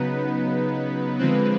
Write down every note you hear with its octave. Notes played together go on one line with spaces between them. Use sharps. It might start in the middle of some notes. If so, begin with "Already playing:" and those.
Already playing: C#3 F#3 B3 D#4 B4
D3 F3 G#3 C4 B4